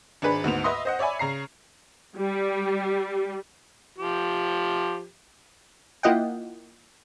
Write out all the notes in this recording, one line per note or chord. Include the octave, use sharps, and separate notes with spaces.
G#1 D4 G#4 B4 B5
D2 G#2 B3 F7
B4 D#5 E5 C6 D#6
C5 D#5 F#5
C#5 D5 E5 G#5 B5
C#3 A#5 C7
G3
F3 G4
A#3 E4 F4 D#5 F#5 G5